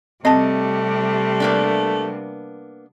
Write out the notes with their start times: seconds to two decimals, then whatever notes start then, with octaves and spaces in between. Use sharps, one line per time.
0.25 C3 G3 A3 C4 D#5 A5
1.40 A#3 B3 D4